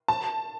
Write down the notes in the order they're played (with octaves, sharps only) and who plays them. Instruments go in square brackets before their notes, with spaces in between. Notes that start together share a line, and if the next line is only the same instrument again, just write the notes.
[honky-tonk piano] A5